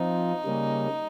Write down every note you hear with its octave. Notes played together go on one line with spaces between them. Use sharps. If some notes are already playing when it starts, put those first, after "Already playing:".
Already playing: F3 C4 D#4 F4
C#3 G3 A#3 C#4